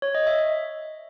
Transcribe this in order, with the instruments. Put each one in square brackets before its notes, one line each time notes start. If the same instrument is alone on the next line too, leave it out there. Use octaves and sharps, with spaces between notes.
[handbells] C#5
D#5
E5